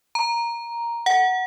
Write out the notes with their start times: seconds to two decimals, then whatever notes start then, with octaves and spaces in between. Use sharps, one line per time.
0.15 A#5
1.06 F#5